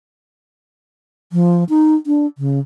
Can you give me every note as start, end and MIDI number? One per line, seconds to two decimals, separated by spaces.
1.33 1.64 53
1.69 1.95 63
2.07 2.26 62
2.38 2.59 49